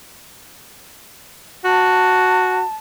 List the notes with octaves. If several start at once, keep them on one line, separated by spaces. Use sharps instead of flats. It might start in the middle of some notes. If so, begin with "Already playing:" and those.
F#4 A5